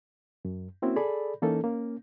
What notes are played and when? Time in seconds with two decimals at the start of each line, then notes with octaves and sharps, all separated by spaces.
0.45 F#2
0.82 A#3 C4 C#4 E4 F#4
0.96 G#4 A4 D5 B5
1.42 E3 A#3 C#4 D#4 A4
1.64 A#3 C#4